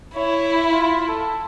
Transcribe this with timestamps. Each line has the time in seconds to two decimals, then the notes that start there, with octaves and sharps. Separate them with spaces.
0.15 E4 C#5
0.71 F4
1.08 A4